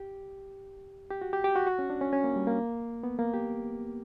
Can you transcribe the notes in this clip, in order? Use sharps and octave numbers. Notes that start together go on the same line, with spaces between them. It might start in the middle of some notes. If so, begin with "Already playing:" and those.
Already playing: G4
G4
F#4
G4
G4
F#4
F#4
C#4
D4
C#4
C#4
A#3
G3
A#3
B3
A#3
G4